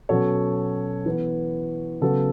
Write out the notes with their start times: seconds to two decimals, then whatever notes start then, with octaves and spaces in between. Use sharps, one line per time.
0.09 B2 F#3 C#4 A4 C#5
1.06 E3 B3
2.01 C#3 F#3 B3 A4